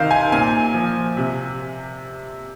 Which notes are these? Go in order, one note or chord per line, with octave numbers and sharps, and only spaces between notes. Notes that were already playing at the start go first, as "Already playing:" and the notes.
Already playing: C3 D#3 C5 F5
G#5
A#2 G#5
F3
C3